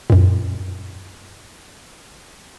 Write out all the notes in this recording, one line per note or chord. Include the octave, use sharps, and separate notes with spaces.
F#2 A#2